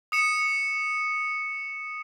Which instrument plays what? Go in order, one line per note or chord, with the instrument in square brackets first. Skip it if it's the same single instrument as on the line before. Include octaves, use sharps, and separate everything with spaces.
[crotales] D#6 C#7 E7